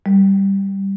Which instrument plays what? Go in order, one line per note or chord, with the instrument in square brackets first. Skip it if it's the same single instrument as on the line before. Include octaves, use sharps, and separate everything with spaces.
[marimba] G3